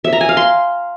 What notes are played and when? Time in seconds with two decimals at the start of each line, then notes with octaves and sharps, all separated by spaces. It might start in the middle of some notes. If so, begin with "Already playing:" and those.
0.04 E5
0.13 A#5
0.21 G#5
0.29 F5
0.37 C6